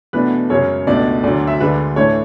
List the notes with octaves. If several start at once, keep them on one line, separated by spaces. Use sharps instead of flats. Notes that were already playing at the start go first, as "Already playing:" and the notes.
E2 B2 A3 D4 B4
F#2 C#3 G#3 C#5
C#2 B2 A3 D4 D5
D2 D3 F#3 D5
E5
D2 D3 G#3 D4 B4
A2 E3 A3 D4 C#5